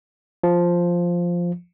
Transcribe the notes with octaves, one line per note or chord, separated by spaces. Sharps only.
F3